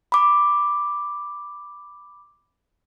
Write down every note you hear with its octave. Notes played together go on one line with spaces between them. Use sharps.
B5 D6